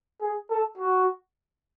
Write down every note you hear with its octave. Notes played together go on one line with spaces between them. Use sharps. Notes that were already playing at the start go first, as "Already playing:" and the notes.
G#4
A4
F#4